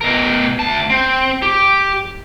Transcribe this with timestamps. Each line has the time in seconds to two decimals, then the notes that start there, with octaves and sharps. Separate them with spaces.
0.01 B2 A#4
0.59 D2 A5
0.90 C4
1.42 G4